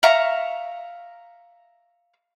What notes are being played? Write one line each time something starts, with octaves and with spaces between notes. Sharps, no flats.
E5 F5 A#5 C#6